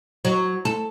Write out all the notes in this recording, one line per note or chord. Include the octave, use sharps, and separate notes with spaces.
F#3
A4